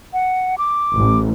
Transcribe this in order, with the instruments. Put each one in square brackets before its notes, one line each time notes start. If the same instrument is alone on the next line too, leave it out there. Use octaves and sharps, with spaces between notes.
[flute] F#5
D6
[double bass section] A1